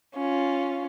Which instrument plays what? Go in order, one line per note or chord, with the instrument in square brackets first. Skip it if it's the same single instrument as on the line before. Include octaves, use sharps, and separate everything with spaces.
[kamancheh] C#4 F4